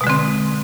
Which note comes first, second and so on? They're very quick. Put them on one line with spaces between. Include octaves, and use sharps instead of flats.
B2 G#3 D3 C4